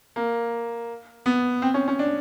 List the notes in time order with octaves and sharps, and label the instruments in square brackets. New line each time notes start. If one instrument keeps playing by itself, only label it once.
[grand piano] A#3
B3
C4
C#4
C#4
D4